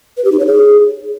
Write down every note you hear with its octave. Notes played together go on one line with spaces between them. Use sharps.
B4
G4
D#4
C#5
G#4